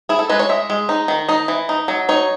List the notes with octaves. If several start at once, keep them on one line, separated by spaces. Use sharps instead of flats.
E4 G#4
A4
G#3 B4
C#5
G#3 E5
G#3
D#4
D#3
D#4 D#5
E3
D#4
F#3
D#4 C#5